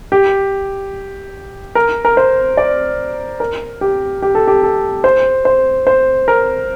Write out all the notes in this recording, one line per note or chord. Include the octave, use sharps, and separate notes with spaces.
G4
A#4
A#4
C5
D5
A#4
G4
G4
A4
G4
A4
C5
C5
C5
A#4